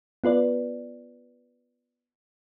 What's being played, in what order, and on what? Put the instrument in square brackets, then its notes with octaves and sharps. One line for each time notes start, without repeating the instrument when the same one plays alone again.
[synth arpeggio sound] B3 F4 B4 D5